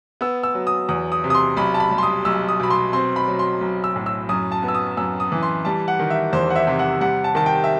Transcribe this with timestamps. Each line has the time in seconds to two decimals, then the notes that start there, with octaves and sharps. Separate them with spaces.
0.21 B3 E6
0.43 E6
0.55 F#3
0.67 D#6
0.89 E2 D#6
1.12 D#6
1.24 C3
1.30 D#6
1.35 C6
1.57 B1 B5
1.74 A5
1.80 B5
1.91 G3
1.98 C6
2.03 D#6
2.25 B1 E6
2.49 D#6
2.60 B2 B5
2.70 C6
2.93 C4 C6
3.16 B5
3.28 F#3
3.39 C6
3.61 B1
3.84 E6
3.96 A2
4.06 E6
4.29 F#2 D#6
4.52 A5
4.63 B3
4.68 E6
4.75 D#6
4.97 F#2 E6
5.20 D#6
5.32 E3
5.43 C6
5.65 G3 A5
5.88 F#5
6.00 D#3
6.10 E5
6.33 E2 C5
6.50 F#5
6.56 E5
6.67 C3
6.79 F#5
7.01 G3 F#5
7.24 A5
7.35 D#3 A5
7.46 G5
7.64 E5